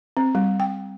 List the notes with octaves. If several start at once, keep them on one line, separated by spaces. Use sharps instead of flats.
C4
G3
G5